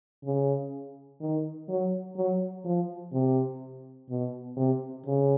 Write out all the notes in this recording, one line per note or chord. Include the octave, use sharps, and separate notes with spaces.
C#3
D#3
F#3
F#3
F3
C3
B2
C3
C#3